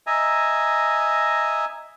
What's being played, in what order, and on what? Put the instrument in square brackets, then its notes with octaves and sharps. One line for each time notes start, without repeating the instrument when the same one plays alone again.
[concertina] D#5 E5 G#5 A#5